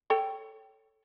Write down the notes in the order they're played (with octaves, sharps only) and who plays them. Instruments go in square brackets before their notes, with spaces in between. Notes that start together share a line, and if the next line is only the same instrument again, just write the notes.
[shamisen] A4 C#5 G5